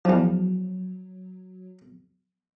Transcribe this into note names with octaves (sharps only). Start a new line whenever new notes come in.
E2 F3 F#3